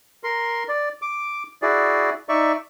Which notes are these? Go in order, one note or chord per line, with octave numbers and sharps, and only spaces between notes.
A#4 C6
D5
D6
E4 F#4 G#4 D5
D#4 D5 E5 C#6